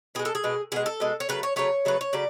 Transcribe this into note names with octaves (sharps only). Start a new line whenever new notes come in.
B2 G#3 G#4
A4
G#4
B2 G#3
B2 G#3 G#4
A4
B2 G#3
C#5
C#3 F#3 A3 B4
C#5
C#3 F#3 A3 C#5
C#3 F#3 A3 B4
C#5
C#3 F#3 A3 D5